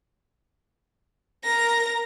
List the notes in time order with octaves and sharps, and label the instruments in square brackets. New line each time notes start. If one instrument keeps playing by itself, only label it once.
[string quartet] A#4 A#5 [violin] A#6